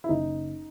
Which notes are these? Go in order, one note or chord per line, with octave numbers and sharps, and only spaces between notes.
E4
F#1 D#4